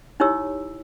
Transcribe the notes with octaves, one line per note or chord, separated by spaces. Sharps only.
D#4 E4 G4 C#5 E6